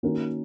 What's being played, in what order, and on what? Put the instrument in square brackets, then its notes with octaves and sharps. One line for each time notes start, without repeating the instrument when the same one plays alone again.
[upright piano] D#3 A#3 C#4 F#4 A#4